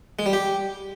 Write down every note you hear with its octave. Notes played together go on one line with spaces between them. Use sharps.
G#3
G3
G4